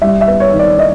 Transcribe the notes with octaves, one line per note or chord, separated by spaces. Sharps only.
G3 E5
E5
B3
C#5
D#3
D5
D#4 D#5